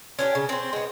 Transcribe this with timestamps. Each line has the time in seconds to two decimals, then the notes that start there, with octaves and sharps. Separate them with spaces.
0.19 C#4 D4 F4 G4
0.35 C#3
0.49 C4 C5
0.73 G#3 B3